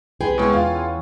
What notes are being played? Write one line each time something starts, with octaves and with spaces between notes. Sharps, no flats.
C2 G#4 B4 G5 C6
B2 G#3 C#4 E4 F#4
E2 F4 F5
F#5 G#5